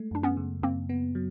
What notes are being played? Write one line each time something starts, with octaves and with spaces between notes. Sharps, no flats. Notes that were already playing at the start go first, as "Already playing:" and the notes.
Already playing: G#3 A3
F#2 D4
B3 C#4
C#3
F#2 A#3 C4
B3
F#3